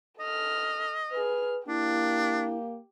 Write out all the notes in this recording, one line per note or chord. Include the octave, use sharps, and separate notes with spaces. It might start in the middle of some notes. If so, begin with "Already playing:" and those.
A4 D#5 F6
G#4 B4 F6
A#3 D4 E4 G4